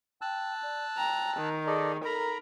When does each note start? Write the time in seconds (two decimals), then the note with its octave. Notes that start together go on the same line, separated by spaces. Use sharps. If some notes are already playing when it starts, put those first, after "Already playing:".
0.21 G5 A5 E6 F#6
0.63 D5
0.98 G5 A#5
1.38 D#3
1.67 G#4 A4 D5 D#5
2.05 A4 A#4 A#5 B5